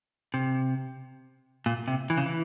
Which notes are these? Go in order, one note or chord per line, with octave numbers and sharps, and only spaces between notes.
C3
A#2
C3
E3
C#3
E3